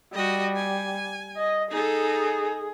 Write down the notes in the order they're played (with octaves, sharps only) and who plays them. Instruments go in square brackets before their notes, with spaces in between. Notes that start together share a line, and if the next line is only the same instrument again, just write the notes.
[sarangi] G3 [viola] F#4 D#5
[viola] G#5
[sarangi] D#5
[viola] D#4 A4 [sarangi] G#4